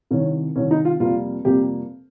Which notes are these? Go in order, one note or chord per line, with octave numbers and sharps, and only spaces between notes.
C2 C3 D#3 C#4
C2 C3 D#3 C#4
D#4
F4
F2 C3 G3 A#3 F4
F2 C3 G3 A#3 G4